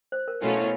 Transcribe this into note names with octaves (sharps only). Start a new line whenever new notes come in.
C5
A#4
B2 F#3 A3 C#4 E4 F4
E4